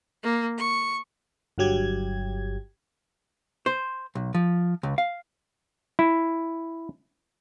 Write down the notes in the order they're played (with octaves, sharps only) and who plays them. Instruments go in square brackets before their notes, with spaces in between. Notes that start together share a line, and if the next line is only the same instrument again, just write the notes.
[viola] A#3
C#6
[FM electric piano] G1 G2 F#3 G4 G#6
[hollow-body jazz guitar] C5
B1
F3
C#2
F5
[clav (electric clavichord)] E4